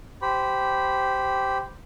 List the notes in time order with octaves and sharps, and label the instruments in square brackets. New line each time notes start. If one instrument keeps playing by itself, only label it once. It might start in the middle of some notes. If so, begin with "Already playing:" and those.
[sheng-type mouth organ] G4 C5 B5